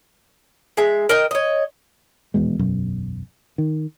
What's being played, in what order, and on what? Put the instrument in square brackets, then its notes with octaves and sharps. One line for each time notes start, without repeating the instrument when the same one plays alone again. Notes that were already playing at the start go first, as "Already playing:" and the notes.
[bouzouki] G#3 E5
A#4 D#5 G5
C#5 D#5
[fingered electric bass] D#1 E2 B2 G#3
E1 B1 F#2
D#3